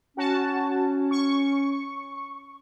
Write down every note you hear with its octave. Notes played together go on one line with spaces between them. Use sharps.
C#4 F#4 A5
C#6